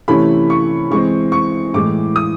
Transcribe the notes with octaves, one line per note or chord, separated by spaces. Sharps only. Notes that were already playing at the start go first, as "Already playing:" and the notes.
C3 E3 A3 C#4 E4 B5
C#6
E3 G#3 C4 C#6
C#6
A2 E3 G#3 D6
D#6